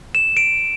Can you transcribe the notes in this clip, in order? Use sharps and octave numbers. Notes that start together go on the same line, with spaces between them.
E7
D7